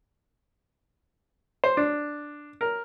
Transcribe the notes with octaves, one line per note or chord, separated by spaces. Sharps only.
C5
D4
A#4